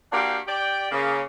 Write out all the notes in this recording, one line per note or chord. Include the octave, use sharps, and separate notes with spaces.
A#3 D4 F#4 G4 F5 G5
G4 D5 G5
C#3 A#3